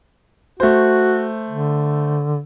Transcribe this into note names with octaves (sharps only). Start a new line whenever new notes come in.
A3 F#4 C5
D3